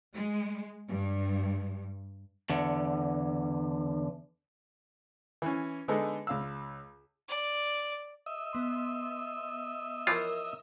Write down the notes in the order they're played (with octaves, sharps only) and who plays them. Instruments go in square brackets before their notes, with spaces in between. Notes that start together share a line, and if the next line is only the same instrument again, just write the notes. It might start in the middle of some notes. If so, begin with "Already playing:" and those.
[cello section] G#3
G2
[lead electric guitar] E2 D3
[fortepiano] E3 C#4
D3 G#3 B3 D#4 G#4 A4
C#2 F5 E6
[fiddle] D5
[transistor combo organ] D#5 E5
[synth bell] B3 C6
[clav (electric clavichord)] E3 F3 F4 [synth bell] A#4 C#5